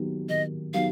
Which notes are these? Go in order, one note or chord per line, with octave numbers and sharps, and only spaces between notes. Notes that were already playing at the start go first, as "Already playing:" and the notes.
Already playing: D#3 F#3 B3 D#4 G4
D#3 D#5
F#3 B3 D#4 G4 F5